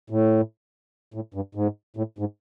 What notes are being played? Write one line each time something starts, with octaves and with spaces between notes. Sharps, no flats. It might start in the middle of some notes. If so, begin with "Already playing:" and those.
A2
A2
G2
G#2
A2
G#2